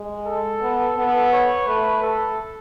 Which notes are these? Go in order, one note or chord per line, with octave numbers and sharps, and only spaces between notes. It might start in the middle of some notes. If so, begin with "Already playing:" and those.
Already playing: G#3
A4
B3
B3
C#5
A3 B4
A4